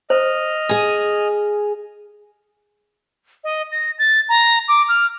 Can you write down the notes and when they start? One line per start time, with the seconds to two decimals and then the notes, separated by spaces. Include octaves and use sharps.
0.10 C5 D#5 F6
0.69 G#4 G#5
3.44 D#5
3.72 A#6
3.99 A6
4.29 A#5
4.68 D6
4.89 F6